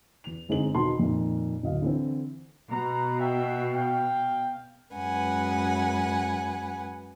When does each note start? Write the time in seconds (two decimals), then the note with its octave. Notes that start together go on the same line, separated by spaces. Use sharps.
0.24 E2 F7
0.49 G1 G#3 C4 D#4 F#7
0.74 E1 B2 D#3 A5 C6
0.99 F2 A#2 D#3 A#3
1.63 D1 D#5 F5
1.82 D3 E3 C4
2.71 B2 B4 A#5
3.20 E5 F#5 G5
3.75 F5 G5
4.95 F#2 G#3 B4 F#5 G#5